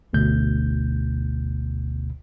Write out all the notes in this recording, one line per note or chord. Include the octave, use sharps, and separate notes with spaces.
G1 D2 B2 G6